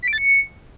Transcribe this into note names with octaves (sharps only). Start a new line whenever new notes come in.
B6
D7
A6
C#7